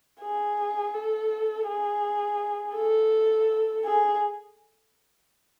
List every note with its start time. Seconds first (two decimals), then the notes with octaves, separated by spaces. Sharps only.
0.21 G#4
0.94 A4
1.66 G#4
2.76 A4
3.85 G#4